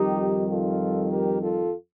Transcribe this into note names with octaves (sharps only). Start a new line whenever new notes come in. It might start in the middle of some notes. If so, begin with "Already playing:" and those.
Already playing: F2 D#3 G3 D#4 G4
F4 A4
G4 A#4
F4 A4